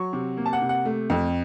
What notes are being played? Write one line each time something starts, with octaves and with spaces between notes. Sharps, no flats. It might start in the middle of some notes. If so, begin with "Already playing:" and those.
Already playing: F#3 C#6
C3
A#3
A5
F#5
C3
F#5
A3
F2